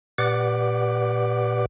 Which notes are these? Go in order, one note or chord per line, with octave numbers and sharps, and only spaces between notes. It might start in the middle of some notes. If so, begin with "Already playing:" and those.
A#2 G4 B4 D5 F#5 D6